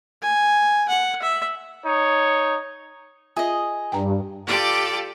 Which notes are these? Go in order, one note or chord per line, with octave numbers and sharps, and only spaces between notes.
G#5
F#5
E5
D#4 C#5
F4 G#4 D#5 E5
G2 G5 A#5
F4 G4 A4 D5